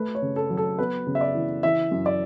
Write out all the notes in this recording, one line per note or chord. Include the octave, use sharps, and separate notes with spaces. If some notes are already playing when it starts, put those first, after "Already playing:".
Already playing: A3 B4
C#5
C#3
A4
F#3
A4
B3 B4
C#3
E5
D5
E3
E3 E5
F#2
D5